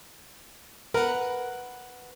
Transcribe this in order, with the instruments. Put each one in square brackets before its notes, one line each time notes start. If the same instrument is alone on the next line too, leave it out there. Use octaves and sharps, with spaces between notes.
[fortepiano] A#4 [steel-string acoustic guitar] B4 F#5